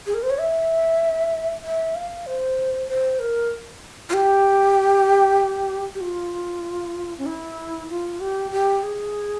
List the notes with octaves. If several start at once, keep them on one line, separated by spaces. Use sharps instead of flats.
G#4
A#4
C5
C#5
E5
E5
F5
C5
C5
A#4
F4
G4
G4
F4
C#4
E4
F4
G4
G4
G#4